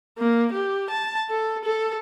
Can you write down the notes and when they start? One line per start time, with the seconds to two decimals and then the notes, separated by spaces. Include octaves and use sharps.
0.18 A#3
0.53 G4
0.90 A5
1.30 A4
1.65 A4